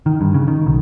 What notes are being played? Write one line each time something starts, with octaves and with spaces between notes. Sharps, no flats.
D#3
G2
C#3
D#3
B1